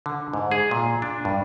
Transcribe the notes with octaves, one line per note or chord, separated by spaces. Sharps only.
D3
G#2
G#4
A#2
D4
G2